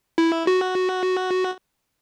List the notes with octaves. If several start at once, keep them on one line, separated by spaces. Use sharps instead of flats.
E4
F#4